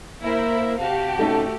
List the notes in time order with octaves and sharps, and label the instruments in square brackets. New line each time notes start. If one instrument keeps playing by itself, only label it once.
[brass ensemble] A#3 [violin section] E4 A#4 C5 [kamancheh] E5
[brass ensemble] C3 A5 [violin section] F#4 G4 [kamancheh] F5
[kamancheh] A3 [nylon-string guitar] C#4 D#4 A4